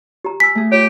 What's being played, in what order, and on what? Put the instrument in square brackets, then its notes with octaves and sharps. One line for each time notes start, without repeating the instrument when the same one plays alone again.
[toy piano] G4 A#5
[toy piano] G#5 E6 [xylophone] B6
[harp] A3 G#4
[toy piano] F4 C#5 [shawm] G4